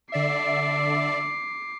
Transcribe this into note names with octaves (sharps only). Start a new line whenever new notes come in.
D3 D5 E5 D6 C7